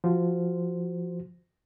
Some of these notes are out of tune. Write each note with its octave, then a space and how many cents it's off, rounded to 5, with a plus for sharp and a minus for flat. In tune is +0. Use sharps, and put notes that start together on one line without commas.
F3 -10 F#4 +0 C5 -10